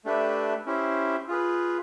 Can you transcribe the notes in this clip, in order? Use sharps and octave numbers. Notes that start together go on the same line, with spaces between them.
A3 D4 G4 B4 E5
C#4 E4 G4 C5 E5
F4 G#4 B4